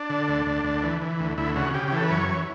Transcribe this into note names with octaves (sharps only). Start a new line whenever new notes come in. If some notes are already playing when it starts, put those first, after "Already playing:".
Already playing: D4
D3
D2
D2
D2
E3
E3
D2
D2 E4
C#3 F#4
C#3 G4
G4
E3 A4
B4
F#2 C#5
E3